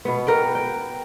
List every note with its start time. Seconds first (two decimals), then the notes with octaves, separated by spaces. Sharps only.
0.05 B2 B3
0.27 B3 A#4 B4 G5
0.55 G5